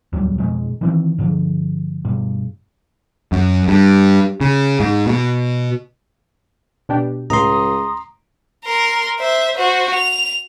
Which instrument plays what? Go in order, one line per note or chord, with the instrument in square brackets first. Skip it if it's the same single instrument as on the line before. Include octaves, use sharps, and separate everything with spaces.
[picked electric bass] D1 E2 F#3 G3
F2 B2 G#3
D#3 E3 C4
G2 D3 F3
G2 B2
F#2
G2
C#3
G#2
B2
[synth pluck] B2 D4 G4
[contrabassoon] C#2 [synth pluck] A2 [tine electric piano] A#5 C6 [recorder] D#6
[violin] A#4 C6
C5 E5
F#4 C5
F7